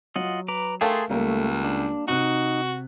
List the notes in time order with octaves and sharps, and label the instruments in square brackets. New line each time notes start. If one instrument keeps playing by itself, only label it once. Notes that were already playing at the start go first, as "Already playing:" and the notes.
[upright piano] F#3 [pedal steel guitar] F4 D#5 F#5
[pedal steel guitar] B4 A#5 D6
[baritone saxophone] A3 [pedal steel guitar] G#4 A5 C6 [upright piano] A#4 F5 G5
[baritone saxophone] C#2 [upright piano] G3 A#3 A#4 [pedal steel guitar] A3
[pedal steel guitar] D4
[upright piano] C3 F#6 [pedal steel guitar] D#4 [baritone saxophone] F#4